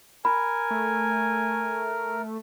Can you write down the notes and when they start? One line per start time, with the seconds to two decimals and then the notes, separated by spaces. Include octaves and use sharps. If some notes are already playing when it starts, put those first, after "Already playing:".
0.25 A#4 G#5 B5
0.71 A3